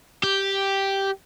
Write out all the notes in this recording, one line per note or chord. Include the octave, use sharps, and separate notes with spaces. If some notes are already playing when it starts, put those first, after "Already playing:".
G4